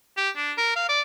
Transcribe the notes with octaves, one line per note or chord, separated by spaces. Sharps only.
G4
D4
A#4
F5
D5